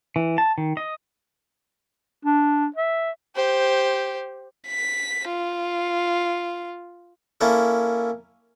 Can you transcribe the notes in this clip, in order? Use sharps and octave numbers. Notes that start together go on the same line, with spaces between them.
E3
A5
D#3
D#5
D4
E5
G4 C5
B6
F4
A#3 C#4 E4 A4